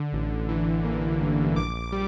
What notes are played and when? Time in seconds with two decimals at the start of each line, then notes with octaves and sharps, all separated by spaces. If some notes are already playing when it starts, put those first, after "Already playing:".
Already playing: D3
0.13 A1
0.49 E3
0.84 A#3
1.21 G2
1.56 A#1 D6
1.92 G3